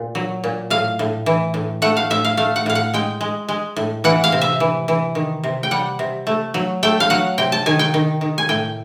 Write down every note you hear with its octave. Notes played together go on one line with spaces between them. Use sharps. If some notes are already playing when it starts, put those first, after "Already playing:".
Already playing: A#2
F#3
A#2
A2 F5
A2
E3
A2
A3 F#5
F5
A2 E5
F5
A3 F5
F#5
A2 F5
F#5
G#3 G5
G#3
G#3
A2
E3 F#5
F5
C3
E5
E3
E3
D#3
C3
G5
G3 F#5
C3
A3
F#3
A3 G5
F5
F#3 F#5
C3 G5
A5
D#3 G#5
G5
D#3
D#3
G#5
A2 G5